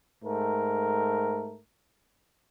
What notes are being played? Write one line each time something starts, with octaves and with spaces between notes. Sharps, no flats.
G#2 A3 A#4